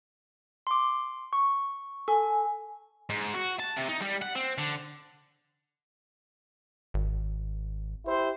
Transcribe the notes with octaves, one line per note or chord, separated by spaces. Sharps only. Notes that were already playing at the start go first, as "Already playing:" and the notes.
C6 D6
C#6
A4 G#5
G#2
F#4
A5
C3
D#4
G3
F#5
C4
D3
G#1
E4 G4 C5